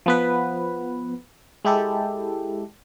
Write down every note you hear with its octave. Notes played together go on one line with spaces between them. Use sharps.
F3 B3 B4
G#3 E4 G4 A4